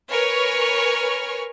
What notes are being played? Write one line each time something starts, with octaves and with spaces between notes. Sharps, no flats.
A#4 B4 C#5 G#5 C#6 F6